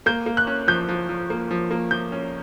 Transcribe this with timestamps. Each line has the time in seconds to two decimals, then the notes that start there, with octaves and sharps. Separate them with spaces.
0.06 A#3 G6
0.26 A#3
0.37 F#6
0.47 C#4
0.68 F3 G6
0.89 F3
1.09 F3
1.30 A#3
1.51 F3
1.71 A#3
1.91 F3 G6
2.12 C#4